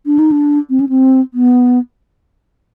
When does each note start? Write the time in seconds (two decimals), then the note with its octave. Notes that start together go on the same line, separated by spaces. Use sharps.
0.06 D4
0.19 D#4
0.31 D4
0.70 C4
0.80 C#4
0.89 C4
1.34 B3